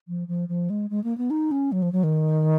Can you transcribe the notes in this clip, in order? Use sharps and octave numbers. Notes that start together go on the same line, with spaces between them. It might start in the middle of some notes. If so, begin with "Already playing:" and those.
F3
F3
F3
G#3
G#3
A#3
B3
D#4
C#4
F#3
F3
F#3
D#3